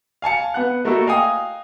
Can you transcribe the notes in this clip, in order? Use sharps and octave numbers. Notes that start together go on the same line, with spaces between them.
F5 G#5 A5 C#7
B3 F#5 F#6
A3 A#3 E4 F#4 A4
D#5 F5 G5 G#5 D#6